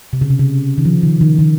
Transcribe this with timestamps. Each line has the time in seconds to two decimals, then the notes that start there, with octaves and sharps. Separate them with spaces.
0.13 C3
0.21 C#3
0.30 C3
0.39 C#3
0.78 D#3
0.85 F3
1.03 D#3
1.21 D#3
1.39 D#3